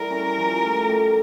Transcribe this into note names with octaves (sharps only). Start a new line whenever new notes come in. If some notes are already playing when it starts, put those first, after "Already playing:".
Already playing: G3 E4 A4 A#4
C#4
F3
A3
G4